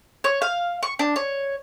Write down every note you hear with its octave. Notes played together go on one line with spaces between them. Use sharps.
C#5
F5
C#6
D4
C#5